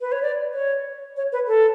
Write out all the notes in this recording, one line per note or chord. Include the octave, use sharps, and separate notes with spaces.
B4
C#5
D5
C#5
C#5
B4
A4